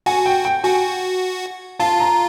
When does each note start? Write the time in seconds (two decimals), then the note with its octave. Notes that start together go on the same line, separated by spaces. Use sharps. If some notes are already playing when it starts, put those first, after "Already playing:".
0.06 F#4 G#5
0.26 G5
0.45 G5
0.64 F#4 G#5
1.80 F4 A5
2.00 A#5